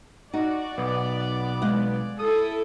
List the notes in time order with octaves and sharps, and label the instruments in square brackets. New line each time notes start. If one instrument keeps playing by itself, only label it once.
[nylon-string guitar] D#4 [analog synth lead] F#4 [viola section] D5
[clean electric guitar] B1 [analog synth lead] B3
[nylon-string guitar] G#3 F5 F#5
[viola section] E4 A4 [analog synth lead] D#6